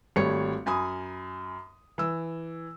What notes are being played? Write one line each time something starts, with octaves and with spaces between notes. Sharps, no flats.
G#1 G3 A3 C#5 C#7
F#2 G#5 B5 D#6
E3 E6